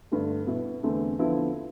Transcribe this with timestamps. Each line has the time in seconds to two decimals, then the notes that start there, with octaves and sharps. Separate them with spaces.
0.11 G2 D3 A3
0.47 B2 B3 E4
0.83 E2 D3 A3 C4
1.19 D3 F3 B3 E4